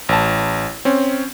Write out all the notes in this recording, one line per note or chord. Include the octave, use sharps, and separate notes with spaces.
A1 A5
C4 C#4